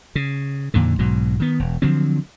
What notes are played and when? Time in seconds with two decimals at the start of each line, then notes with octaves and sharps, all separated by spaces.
0.15 C#3
0.74 F2 A#2 D3 D#3
0.99 B1 G#2 B2 F#3
1.40 D#3 B3
1.60 E1
1.82 D3 F3 F#3 C4